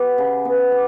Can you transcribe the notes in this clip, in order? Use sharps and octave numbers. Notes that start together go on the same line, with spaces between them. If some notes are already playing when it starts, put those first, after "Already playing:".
Already playing: B3 G4
C#3
B3
G4